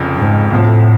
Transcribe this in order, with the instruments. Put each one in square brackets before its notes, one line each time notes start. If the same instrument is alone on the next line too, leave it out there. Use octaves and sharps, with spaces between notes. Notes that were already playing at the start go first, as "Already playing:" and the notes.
Already playing: [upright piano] F1 F2 C#3
[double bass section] G#2
[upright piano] D2 C3 F3 [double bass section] A2